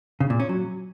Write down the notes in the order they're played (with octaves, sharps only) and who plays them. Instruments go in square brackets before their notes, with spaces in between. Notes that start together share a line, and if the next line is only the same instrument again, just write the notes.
[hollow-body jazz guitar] C#3
A#2
C#4
F#3